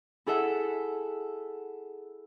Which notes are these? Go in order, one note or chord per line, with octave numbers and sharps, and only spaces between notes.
E4 G#4 A4 E5 F#5